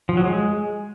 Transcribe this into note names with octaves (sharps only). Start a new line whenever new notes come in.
F3
F#3
G#3